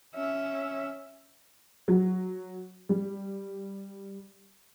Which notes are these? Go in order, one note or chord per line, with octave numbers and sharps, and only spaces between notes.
C#4 E5
F#3
G3